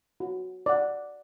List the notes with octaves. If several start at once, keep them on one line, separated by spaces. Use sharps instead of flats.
F#4
D5 F#5